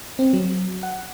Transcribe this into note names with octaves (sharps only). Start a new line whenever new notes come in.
C4
F#3
F#5